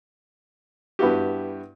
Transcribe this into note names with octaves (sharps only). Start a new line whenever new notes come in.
G2 B3 E4 F#4 G4